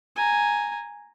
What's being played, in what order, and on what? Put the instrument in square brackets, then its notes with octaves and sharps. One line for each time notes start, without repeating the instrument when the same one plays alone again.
[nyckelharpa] G#5 A#5